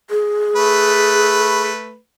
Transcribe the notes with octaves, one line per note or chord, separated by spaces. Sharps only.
G#4
A3 B4